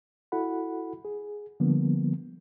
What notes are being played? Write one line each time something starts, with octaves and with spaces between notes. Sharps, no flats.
E4 F#4 A4 F#5 B5
G#4
D3 F3 G3 A#3 B3